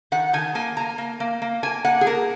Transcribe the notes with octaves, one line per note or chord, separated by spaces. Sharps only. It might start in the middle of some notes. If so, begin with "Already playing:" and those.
D#3 F#5
D#3 G#5
A#3 G#5
A#3 A#5
A#3
A#3
A#3
A#3 G#5
A#3 F#5
G#4
A#3 A#4